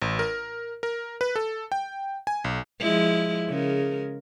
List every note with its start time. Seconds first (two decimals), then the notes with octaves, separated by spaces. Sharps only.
0.02 A1
0.19 A#4
0.83 A#4
1.21 B4
1.36 A4
1.72 G5
2.27 G#5
2.44 B1
2.80 F3 G#3 E4
3.48 C#3 G#3 A#4